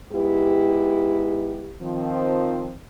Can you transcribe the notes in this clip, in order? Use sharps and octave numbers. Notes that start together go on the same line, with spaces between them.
G#2 B3 E4 G4
D#3 F3 C4